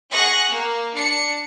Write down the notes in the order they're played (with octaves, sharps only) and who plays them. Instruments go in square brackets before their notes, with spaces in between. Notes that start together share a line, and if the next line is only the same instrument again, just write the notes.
[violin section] G#4 F#5 C#6 F#6 A#6
A#3
D4 C#7